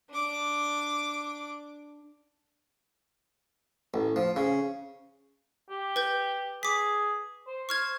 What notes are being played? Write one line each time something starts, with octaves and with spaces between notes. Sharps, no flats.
D4 D6
A1
F3
C#3
G4
B4 G6
G#4 D6 B6
C5
C#6 F6 G#6